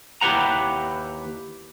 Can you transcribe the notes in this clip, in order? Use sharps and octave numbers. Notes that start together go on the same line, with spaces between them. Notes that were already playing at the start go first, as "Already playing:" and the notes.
D#2 E4 G4 B4 F#5 A#5